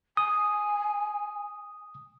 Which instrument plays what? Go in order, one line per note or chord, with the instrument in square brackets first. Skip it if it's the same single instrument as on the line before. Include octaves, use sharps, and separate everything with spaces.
[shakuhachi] G#5 [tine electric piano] D#6